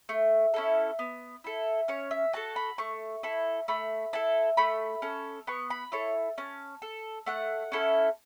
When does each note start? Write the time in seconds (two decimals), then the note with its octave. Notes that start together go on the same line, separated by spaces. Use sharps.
0.09 A3
0.54 C#4 E4 A4
0.99 B3
1.44 E4 A4
1.88 C#4 C#5
2.11 E5
2.33 F#4 A4 A5
2.56 B5
2.78 A3 C#6
3.23 E4 A4
3.68 A3 B5
4.13 E4 A4 A5
4.57 A3 B5
5.02 C#4 A4
5.47 B3 C#6
5.70 B5
5.92 E4 A4 C#5
6.38 C#4 A5
6.82 A4
7.26 A3 F#5
7.72 C#4 E4 A4